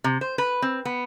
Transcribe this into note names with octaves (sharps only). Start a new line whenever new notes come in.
C3
C5
B4
C4
B3